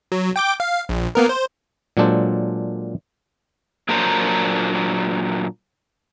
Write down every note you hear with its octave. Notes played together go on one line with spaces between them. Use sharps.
F#3
G5 D6 G6
F5
A#1
A#3 B3 A#4
C5
A#2 F#3 G#3 D4 A4 C5
A#2 F#3 A#3 D4 C5 A#5